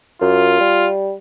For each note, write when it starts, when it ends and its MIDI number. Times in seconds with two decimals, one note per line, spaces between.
0.21 0.56 42
0.21 0.88 65
0.60 1.14 55